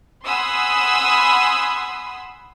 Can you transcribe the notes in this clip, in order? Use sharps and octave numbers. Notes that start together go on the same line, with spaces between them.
F#5 G#5 B5 C6 D#6 E6